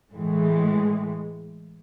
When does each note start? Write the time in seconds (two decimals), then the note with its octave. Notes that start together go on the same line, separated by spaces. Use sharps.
0.13 A2 E3 G#3